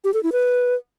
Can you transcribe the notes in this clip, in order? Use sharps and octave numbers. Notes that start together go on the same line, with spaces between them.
G4
A4
E4
B4